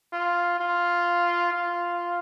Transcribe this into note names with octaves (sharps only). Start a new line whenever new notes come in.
F4
F4
F4